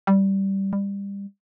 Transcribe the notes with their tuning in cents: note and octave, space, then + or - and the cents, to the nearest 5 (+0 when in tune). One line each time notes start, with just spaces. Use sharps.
G3 -10
G3 +25